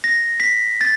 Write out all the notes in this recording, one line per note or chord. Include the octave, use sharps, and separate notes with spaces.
A#6
B6
A6